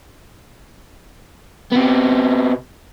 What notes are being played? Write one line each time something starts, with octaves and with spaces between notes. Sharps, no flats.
C3 B3